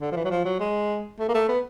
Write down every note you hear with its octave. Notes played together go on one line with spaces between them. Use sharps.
D3
F3
E3
F#3
F3
F#3
G#3
A3
A#3
A3
B3